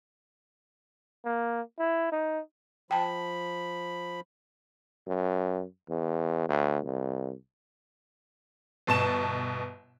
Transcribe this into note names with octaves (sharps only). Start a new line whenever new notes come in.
A#3
E4
D#4
F3 G5 A5 B5
F#2
E2
D2
C2
G1 B2 A5 E7